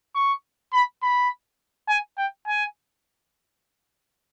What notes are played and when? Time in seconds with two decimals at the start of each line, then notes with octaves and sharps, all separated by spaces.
0.15 C#6
0.74 B5
1.03 B5
1.89 G#5
2.18 G5
2.47 G#5